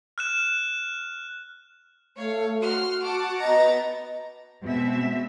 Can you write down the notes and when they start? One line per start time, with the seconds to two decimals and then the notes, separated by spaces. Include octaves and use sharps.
0.18 F6 F#6 E7
2.17 A3 C#5 F5
2.61 F#4 F#5 C6 F6
3.02 F#5 A5 D6
3.41 B3 D#5 A#5 A6
4.63 B2 G#3 C4 E5